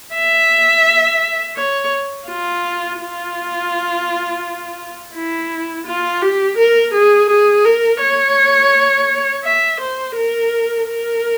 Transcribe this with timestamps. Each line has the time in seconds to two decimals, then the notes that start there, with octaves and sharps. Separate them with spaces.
0.13 E5
1.56 C#5
2.28 F4
3.00 F4
5.14 E4
5.86 F4
6.22 G4
6.58 A#4
6.93 G#4
7.29 G#4
7.65 A#4
8.01 C#5
9.44 E5
9.80 C5
10.16 A#4
10.87 A#4